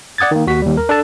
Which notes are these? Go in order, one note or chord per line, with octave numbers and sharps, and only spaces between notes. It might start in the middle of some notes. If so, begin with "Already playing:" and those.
D5 F#5 D#6 G#6 A6
D#3 A#3
D#2 F#4 B6
D#2 G3
A#4
D4 A4 A5